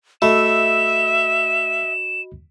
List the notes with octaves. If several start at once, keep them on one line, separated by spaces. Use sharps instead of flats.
A3 F#4 D#5 E5 B5 E7